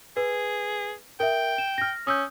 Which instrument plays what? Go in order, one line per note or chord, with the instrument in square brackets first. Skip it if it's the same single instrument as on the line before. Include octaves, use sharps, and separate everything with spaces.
[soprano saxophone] G#4 [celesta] B4
[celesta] A#4 E5 [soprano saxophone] G5
[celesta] E7
F6 A#6
[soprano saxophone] C#4 [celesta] D#6 E6 G6